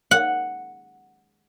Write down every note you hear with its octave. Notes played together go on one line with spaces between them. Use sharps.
F#5